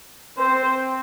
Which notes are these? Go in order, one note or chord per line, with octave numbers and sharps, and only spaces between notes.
C4 C5